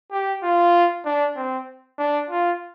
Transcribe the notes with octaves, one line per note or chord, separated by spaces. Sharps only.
G4
F4
D4
C4
D4
F4